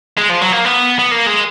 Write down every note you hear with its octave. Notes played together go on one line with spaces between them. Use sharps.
G#3
F3
F#3
A#3
B3
B3
A#3
G#3